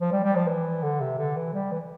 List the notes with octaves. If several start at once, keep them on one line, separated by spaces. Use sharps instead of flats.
F3
G3
G3
F3
E3
D3
C3
D3
E3
G3
E3